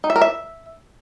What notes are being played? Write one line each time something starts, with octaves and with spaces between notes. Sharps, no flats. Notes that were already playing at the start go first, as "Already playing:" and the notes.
D#4
E5
A#4
E5